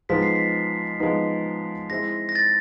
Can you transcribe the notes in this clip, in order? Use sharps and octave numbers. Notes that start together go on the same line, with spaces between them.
F3 G#3 B3 D#4 B6
C7
B6
F3 G#3 B3 D#4
G#3 C4 E4 A#6
A#6
A6